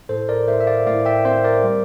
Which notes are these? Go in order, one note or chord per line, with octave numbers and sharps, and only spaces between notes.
A2 A4 C5
A#4 D5
A2 C5 E5
E5
D5 F5
A2 D5 F5
E5 G5
C4 C5 E5
A#4 D5
G3